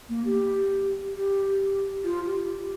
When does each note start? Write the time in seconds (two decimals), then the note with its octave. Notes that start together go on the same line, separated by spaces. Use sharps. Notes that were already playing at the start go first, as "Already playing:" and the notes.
0.09 A#3
0.25 G4
1.15 G4
2.04 F4
2.26 G4